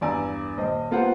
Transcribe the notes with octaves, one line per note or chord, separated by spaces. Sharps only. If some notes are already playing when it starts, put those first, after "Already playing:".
E2 G2 D5 G#5 A#5 E6
D#1 C5 D#5
A#3 B3 F4 G4 C5 F#5